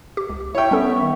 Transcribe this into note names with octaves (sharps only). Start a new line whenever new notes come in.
G4
C#2
E4 C#5 E5 G5 C#6
G3 B3 C#4 A4
D#3